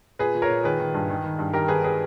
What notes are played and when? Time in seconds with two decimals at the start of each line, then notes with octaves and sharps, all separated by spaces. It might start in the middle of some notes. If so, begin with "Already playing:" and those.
0.19 A#2 G#4 B4
0.35 A#2
0.42 A#4 C#5
0.50 A#2
0.64 D#3 G#4 B4
0.80 D#3
0.94 G2
1.10 D#3
1.24 D#3
1.39 G2
1.53 D#3 G4 A#4
1.68 D#3 G#4 B4
1.84 G#4 B4